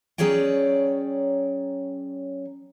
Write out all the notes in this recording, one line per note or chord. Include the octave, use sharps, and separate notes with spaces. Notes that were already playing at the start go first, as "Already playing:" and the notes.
F#3 C#4 G#4 C#5 D5 G5